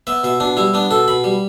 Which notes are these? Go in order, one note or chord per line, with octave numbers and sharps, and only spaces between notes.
B3 E5
B2 E5
B2 D4
G3 E4
B3 D4
B2 A4
B2 B5
G3